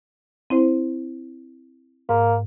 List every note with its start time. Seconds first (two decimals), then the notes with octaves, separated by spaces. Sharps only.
0.50 C4 E4 C5
2.09 G#2 A#3